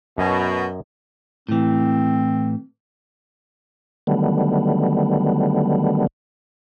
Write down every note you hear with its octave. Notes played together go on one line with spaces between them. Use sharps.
F#2 B2 D#5 G#5
A2 E3 C4
D3 D#3 F#3 G3 A3 B3